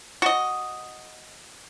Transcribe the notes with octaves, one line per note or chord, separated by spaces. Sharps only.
F#4 D#5